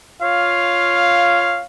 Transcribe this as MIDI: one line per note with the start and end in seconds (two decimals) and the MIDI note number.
0.23 1.65 65
0.23 1.65 73
0.23 1.65 77